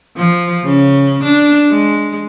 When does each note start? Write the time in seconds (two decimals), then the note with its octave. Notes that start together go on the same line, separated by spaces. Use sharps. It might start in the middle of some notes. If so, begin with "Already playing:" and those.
0.16 F3
0.65 C#3
1.23 D4
1.72 G#3